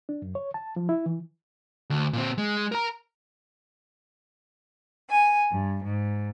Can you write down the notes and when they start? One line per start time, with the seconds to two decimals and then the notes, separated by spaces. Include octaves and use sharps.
0.09 D4
0.22 F#2
0.35 C#5
0.54 A5
0.76 F3
0.89 E4
1.06 E3
1.90 D2
2.13 A#2 C4
2.38 G#3
2.72 A#4 A#5
5.09 G#5
5.50 G2
5.84 G#2